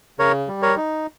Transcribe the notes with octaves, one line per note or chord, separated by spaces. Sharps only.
C#3 A#4 C#5
G3
A#4 C#5
D#4